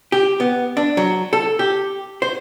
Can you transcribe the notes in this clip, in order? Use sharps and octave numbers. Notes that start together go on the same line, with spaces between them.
G4
B3
D4
F#3
A4
G4
C5